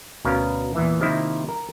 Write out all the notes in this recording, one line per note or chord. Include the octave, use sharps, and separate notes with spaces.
D2 B2 B3 C#4 A#4 F5
E2 A#2 E3 E5
C3 D#3 F3 A#3 D#4 E4
A#4 A#5